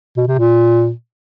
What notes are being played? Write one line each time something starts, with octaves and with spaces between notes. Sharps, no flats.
B2
C3
A#2